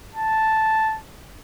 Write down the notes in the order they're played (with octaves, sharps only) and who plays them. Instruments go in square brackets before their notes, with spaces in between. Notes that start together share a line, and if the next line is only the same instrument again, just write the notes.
[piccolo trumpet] A5